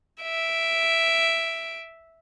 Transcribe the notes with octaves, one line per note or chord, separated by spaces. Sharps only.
E5 D7